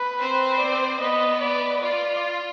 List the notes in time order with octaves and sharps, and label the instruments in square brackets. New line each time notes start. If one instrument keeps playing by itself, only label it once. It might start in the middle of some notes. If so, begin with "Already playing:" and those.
Already playing: [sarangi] B4
[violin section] C4 C5
[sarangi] D5
[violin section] B3 B4 [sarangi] D#5
[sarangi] D5
[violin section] F4 [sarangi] D5